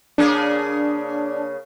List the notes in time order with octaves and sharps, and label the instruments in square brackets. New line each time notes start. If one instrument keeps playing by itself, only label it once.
[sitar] C#3 A#3 G#4 [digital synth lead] D4